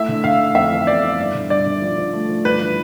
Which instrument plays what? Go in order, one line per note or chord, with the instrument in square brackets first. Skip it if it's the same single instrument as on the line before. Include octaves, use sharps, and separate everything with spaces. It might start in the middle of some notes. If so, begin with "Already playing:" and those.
Already playing: [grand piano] A3 E4 [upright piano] E5
[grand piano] D3
[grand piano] D3 [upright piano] F5
[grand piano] A3
[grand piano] F2 [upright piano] E5
[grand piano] E3
[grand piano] B3 [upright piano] D5
[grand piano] E4
G2
D3
[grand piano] G2 [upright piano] D5
[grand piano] D3
F3
F3
A3
F3
[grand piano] G2 [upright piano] B4
[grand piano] E3